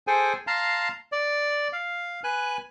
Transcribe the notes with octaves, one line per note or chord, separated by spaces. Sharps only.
G#4 A4 C5 G5 G#5
F5 A5 A#5 C6
D5
F5
B4 G#5 F#6